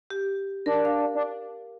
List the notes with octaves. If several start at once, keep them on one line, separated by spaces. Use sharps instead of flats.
G4
D4 A#4
F5
D4